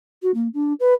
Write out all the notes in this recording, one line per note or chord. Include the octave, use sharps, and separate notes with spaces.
F#4
A#3
D4
B4